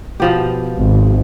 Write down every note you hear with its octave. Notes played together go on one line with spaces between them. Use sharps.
B2 F3 G4
G#1